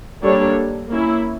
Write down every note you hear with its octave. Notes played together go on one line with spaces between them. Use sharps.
G3 A#3 D4 A4 C#5
A#3 C#4 E4